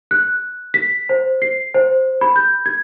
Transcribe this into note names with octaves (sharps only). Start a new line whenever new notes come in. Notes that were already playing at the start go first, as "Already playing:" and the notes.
F#6
B6
C5
C7
C5
B5
G6
G#6